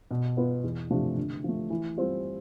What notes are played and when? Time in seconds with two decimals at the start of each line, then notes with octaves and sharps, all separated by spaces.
0.11 B2
0.37 B3 F4 B4
0.64 E2
0.90 C3 F3 A3 D4
1.17 D3
1.44 F3 A3
1.70 E3
1.98 G3 C4 F4